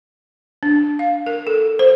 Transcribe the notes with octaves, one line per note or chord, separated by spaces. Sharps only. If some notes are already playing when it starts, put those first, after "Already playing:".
D4
F5
A#4
A4
C5